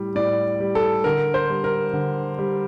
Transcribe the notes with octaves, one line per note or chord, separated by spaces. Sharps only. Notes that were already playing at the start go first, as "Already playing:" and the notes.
Already playing: A2 G3
A2 D5
G3
A4
D3 A#4
C5
G3
A#4
D3
G3